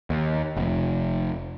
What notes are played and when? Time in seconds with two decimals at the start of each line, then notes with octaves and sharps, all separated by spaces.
0.10 D#2
0.57 F1